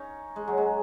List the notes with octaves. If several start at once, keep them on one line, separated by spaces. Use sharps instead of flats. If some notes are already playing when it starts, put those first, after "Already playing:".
Already playing: C#4 D#4
G#3
F#3
G#3